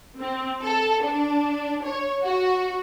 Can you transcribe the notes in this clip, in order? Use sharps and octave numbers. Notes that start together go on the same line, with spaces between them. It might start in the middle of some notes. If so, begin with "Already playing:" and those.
C4
A4
D4
C#5
F#4